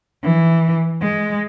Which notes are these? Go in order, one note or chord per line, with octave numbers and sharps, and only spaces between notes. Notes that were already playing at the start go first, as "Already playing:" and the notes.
E3
G#3